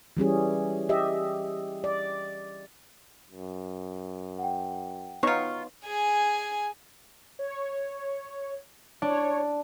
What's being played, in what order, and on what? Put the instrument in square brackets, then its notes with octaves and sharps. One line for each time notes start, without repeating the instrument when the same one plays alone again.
[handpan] E3 G3 C#4 G#4
G4 D#5 E5
D5
[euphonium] F#2
[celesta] F#5 G5
[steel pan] B3 D#4 C#5 [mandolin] F4 C#6
[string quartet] G#4 G#5
[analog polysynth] C#5
[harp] D4 [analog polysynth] C#5